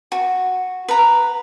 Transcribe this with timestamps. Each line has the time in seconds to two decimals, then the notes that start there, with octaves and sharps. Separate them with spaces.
0.12 F#4
0.89 B4 A#5